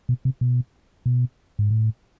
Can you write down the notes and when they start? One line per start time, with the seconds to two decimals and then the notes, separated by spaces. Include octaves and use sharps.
0.09 B2
0.25 C3
0.41 B2
1.06 B2
1.59 G#2
1.70 A2